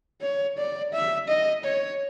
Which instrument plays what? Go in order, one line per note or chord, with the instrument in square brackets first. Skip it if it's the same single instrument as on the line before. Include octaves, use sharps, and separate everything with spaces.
[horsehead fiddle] C#5
D5
E5
D#5
C#5